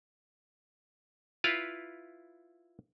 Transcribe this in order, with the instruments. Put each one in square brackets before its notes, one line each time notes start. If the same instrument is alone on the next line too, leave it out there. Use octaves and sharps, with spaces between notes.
[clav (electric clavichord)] E4 F4 B4 F5